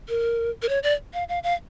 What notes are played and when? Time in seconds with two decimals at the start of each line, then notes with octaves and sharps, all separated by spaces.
0.09 A#4
0.62 A#4
0.69 C#5
0.83 D5
1.14 F5
1.29 F5
1.44 F5